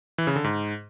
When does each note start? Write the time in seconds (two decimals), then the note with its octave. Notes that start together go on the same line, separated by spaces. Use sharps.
0.18 E3
0.27 C#3
0.36 D3
0.44 G#2